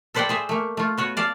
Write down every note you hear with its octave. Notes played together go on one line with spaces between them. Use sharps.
A4 B4 C5 D5 F#5 G5
G#4 C5 E5
A3 A#3
A3 F4
B3 F#4 C#5
D5 F5 A5